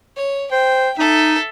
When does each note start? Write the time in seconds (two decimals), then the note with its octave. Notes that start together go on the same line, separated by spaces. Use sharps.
0.16 C#5
0.51 C5 G5
0.98 D#4 A4 E5